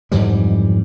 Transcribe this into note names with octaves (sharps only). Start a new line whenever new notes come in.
F2 G#2 E3 G3